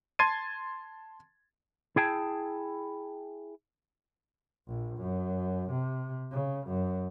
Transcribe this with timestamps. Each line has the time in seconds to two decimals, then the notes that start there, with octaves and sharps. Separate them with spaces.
0.19 A5 C6 G#6 A6 C7 D#7
1.96 E4 G#4 G5 A5
4.67 A#1
4.97 F#2
5.70 C3
6.31 C#3
6.67 F#2